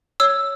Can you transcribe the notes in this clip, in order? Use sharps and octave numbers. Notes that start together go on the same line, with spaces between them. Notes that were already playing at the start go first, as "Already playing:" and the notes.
C#5 E6